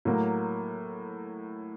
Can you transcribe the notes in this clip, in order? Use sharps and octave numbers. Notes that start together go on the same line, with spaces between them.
A2 F#3 A#3